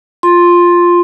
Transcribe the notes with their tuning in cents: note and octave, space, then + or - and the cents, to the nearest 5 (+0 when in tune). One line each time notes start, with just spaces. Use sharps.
F4 +0 C6 +5